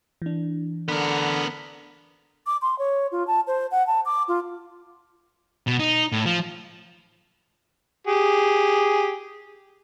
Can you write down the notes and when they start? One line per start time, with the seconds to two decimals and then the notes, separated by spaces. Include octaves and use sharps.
0.22 E3 D4
0.88 D3 B3 A#4
2.47 D6
2.62 C6
2.79 C#5
3.12 F4
3.27 A5
3.47 C5
3.71 F#5
3.87 A5
4.06 D6
4.28 F4
5.67 B2
5.80 D#4
6.12 A2
6.26 F3
8.07 G4 G#4